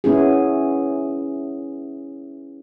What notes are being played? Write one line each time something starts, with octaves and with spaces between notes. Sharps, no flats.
B3 C#4 E4 G#4